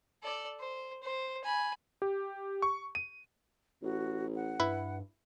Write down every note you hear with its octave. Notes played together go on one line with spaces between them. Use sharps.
A4 D5
C5
C5
G#5 B5
G4
C#6
D#7
A1 F#4
F#5
G2 E4 B4